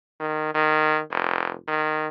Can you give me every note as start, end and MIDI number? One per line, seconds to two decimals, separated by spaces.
0.20 0.54 51
0.55 1.01 51
1.10 1.55 29
1.68 2.08 51